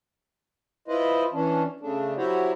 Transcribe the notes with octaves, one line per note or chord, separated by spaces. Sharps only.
E4 F4 B4 C5 D#5
E3 C#4 D4
C#3 A3 D4
F#3 E4 F#4 G4 C5 C#5